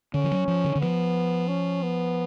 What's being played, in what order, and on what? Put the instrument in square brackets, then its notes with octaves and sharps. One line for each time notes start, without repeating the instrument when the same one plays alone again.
[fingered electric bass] D3 [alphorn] C#4
[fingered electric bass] F3
F#3
F3
D3
D3
[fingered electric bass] F3 [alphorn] B3
[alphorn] C#4
B3